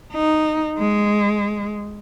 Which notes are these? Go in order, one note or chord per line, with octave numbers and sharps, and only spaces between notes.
D#4
G#3